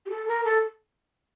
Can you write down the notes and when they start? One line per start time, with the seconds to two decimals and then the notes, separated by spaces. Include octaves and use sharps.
0.06 G4
0.10 A4
0.28 A#4
0.45 A4